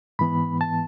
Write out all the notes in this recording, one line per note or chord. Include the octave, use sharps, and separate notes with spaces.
G#2 E3 B3 B5
A5